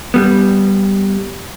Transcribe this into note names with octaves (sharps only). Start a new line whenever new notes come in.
G3 B3